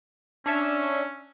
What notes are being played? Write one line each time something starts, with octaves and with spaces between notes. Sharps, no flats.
C#4 D4 C#5 E5